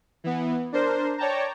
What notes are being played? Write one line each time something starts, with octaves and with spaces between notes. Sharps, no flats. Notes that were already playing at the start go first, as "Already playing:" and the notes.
E3 B3
D4 A#4 C5
C#5 D5 G5 A5 A#5